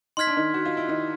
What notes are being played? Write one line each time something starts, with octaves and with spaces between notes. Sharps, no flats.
D#4 C6 F6 G#6 B6
D4
D#3 D#4
F#4
F4
E4
D#3 D#4